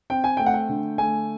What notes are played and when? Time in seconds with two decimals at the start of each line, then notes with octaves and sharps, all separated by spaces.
0.10 C4 G5
0.24 G#5
0.37 A3 G5
0.46 F#5
0.54 G5
0.69 D3
0.98 A3 G#5